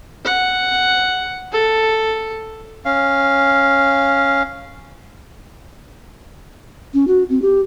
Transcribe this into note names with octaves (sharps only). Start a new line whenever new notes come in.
F#5
A4
C#4 F5
C#4
F#4
C4
G4